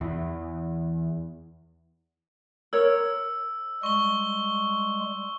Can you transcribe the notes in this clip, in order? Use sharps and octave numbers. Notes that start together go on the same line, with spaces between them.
E2 E3
A#4 C#5 E6
G3 G#3 C6 C#6 G7